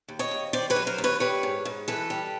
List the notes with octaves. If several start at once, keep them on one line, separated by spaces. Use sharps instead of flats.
D#2
C#5 D#5
D#2
D#3 C5 D5
B4 C#5
F#3
A#4 C5
D#2
B4 C#5
G3 B4 C#5
G#2
G#2
E3 A4 B4
G3